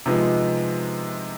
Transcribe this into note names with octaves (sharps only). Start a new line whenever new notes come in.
C3 F3 G#3 B3 D#4